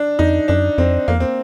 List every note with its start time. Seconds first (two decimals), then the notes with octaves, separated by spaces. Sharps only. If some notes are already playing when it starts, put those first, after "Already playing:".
Already playing: D4
0.19 F2 D#4
0.48 F#2 D4
0.78 F2 C4
1.08 F2 A#3
1.16 E2
1.20 C4